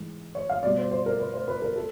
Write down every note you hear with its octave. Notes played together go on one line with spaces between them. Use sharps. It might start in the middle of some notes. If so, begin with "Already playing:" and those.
Already playing: G#2 E3 G#3
C#5
F5
B2 G3 D5
C5
C5
A#4
B4
C5
B4
A#4
A4